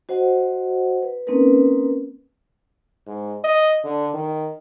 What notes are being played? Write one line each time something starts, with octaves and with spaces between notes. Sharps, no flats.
F#4 C5 D#5 F#5
B4
A#3 C4 C#4 D#4 A#4 B4
G#2
D#5
D3
D#3